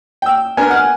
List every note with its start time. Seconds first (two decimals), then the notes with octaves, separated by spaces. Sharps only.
0.22 G5 E6
0.57 B3 D4 A#4 G#5
0.70 F#5 F6